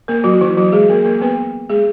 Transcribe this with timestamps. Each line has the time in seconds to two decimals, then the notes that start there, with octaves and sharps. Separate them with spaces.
0.08 A#3 A#4
0.24 F#3 F#4
0.34 F#4
0.41 E3 E4
0.57 F#3 F#4
0.72 G#3 G#4
0.90 A#3 A#4
1.05 A#3 A#4
1.22 B3 B4
1.70 G#3 G#4